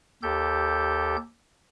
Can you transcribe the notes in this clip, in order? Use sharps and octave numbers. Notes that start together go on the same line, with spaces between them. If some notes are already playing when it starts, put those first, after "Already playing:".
D#2 G4 A4 G6